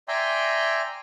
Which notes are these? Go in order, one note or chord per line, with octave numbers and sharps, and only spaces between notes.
D5 E5 G5 G#5 A#5 C6